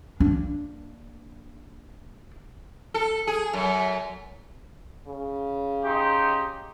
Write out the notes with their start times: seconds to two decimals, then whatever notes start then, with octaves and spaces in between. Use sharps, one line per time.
0.20 A#3 D4
2.94 A4
3.27 G#4
3.53 F#2
5.07 C#3
5.85 D#4 G4 C6